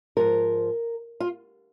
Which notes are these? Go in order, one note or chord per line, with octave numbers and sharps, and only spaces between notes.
G#2 F3 A#4
F4